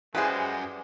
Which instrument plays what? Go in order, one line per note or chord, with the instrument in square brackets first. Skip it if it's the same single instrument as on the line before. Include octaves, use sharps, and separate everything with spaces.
[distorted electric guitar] F#2 [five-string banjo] E3 G3 G#4 [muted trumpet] G#3 [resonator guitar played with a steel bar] B4 C5